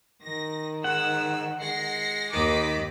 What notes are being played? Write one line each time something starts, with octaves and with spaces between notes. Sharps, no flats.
D#3 A#6
G#2 F#5 E6
G#3 A#6 C7 C#7
D#2 D#3 D#5 D6 B6